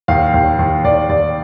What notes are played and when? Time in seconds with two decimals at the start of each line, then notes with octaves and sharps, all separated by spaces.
0.08 D#2 F5
0.34 D#2
0.59 D#2
0.84 D#2 D5
1.09 D#2 D5